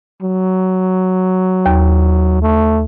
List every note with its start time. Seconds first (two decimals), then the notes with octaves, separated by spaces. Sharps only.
0.22 F#3
1.66 D#2
2.42 A3